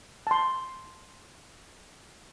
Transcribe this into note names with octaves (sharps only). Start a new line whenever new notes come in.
A5 C6